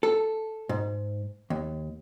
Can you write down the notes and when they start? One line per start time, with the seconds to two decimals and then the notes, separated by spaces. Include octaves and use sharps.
0.03 A4
0.69 G#2
1.50 D#2